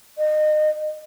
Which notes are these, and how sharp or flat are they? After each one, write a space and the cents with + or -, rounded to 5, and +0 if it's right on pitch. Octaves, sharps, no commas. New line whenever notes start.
D#5 -30